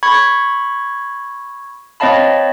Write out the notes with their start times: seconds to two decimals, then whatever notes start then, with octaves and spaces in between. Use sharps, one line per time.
0.03 B5 C#6 G#6
2.00 C4 C#5 D#5 F5 A5 B5